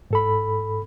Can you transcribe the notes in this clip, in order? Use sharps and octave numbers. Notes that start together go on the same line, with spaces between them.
G#2 A4 B5